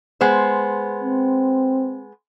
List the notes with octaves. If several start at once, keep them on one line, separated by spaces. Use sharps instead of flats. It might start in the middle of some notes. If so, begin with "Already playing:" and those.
G#3 B3 C5
C4